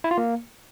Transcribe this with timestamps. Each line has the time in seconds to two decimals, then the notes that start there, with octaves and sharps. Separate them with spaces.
0.04 E4
0.11 F4
0.18 A#3